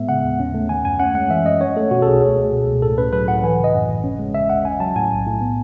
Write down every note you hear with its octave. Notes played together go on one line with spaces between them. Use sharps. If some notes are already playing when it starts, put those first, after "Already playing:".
Already playing: A2 G#3 B3 E5
C#3 F#5
D#2
C#4
A3
D#3 G#5
F#2 G#5
C#4 F#5
G#3 F#5
E3 E5
F#2 D#5
C#4 C#5
A3 A4
B2 F#4
A4
B1 G#4
C#2
A3
B2
C#2
A2 A4
C#4 B4
F#3 B4
A2 F#5
E3 G#5
C#3
D#5
F#2
G#1
C#4
G#3
C#3 E5
D#2 F#5
C#4 G#5
F#3 A5
A2 G#5
B1
A2
B3